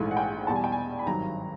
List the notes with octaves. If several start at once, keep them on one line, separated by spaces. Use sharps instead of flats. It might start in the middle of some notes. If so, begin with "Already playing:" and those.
Already playing: A#1 G#2 E3 A3 G#5
F#5
G5
E2 B2 G3 A5
G#5
G5
G#5
B5
G#1 G2 D#3 F#3 A#5